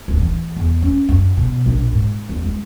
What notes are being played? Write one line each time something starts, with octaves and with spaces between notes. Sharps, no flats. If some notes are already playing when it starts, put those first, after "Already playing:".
D1
E3
E2
C#4
F#2
B2
A#1
G#2
E2
G#3